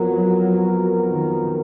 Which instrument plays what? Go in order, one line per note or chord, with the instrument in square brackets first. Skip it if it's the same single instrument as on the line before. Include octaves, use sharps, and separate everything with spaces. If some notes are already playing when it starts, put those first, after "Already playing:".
Already playing: [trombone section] F2 F3 B3 F#4 A#4 [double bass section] F#3
[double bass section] D#3